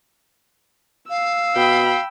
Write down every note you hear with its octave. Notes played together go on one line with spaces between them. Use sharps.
F5 E6
B2 G5 B5